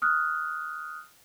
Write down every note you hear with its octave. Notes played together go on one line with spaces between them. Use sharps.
D#6 F6 F#6